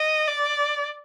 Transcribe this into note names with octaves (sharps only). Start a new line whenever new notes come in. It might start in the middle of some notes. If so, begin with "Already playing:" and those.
Already playing: D#5
D5